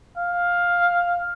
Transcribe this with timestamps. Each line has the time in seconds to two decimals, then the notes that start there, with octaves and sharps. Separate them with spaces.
0.17 F5